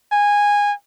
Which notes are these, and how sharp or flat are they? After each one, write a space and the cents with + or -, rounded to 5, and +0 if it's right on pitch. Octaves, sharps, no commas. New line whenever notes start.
G#5 -15